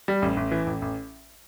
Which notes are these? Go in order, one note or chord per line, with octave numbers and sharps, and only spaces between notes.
G3
A1
A1
E3
A1
A1